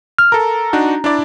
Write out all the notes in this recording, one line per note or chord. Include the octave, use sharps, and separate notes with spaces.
F6
A4 A#4 A#5
D4 D#4 F#4
D4 E4 D5